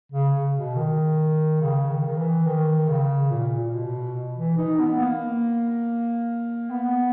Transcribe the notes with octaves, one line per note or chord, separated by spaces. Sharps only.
C#3
B2
D#3
C#3
D#3
D#3
E3
D#3
C#3
A#2
A#2
B2
E3
D#4
B3
A#3
B3